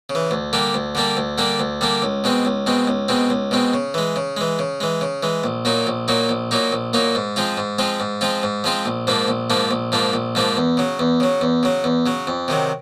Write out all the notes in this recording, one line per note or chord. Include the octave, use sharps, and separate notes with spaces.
C#3
E3
D2
D3 G3 A#3 D4
D2
D3 G3 A#3 D4
D2
D3 G3 A#3 D4
D2
D3 G3 A#3 D4
C#2
B2 G#3 C4
C#2
B2 G#3 C4
C#2
B2 G#3 C4
C#2
B2 G#3 C4
C#3
E3 G#3
C#3
E3 G#3
C#3
E3 G#3
C#3
E3 G#3
A#1
A#2 F#3 A#3 D#4
A#1
A#2 F#3 A#3 D#4
A#1
A#2 F#3 A#3 D#4
A#1
A#2 F#3 A#3 D#4
G#2
F3 G#3 C4 F4
G#2
F3 G#3 C4 F4
G#2
F3 G#3 C4 F4
G#2
F3 G#3 C4 F4
A#1
G#2 F3 A#3 D4
A#1
G#2 F3 A#3 D4
A#1
G#2 F3 A#3 D4
A#1
G#2 F3 A#3 D4
E2
C#3 F#3
E2
C#3 F#3
E2
C#3 F#3
E2
C#3 F#3
F2
C3 D#3 F#3